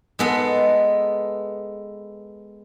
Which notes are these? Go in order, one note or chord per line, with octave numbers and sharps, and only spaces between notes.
G#3 B3 A4